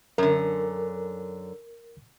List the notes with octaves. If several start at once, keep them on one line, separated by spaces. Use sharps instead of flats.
F#2 D3 A#4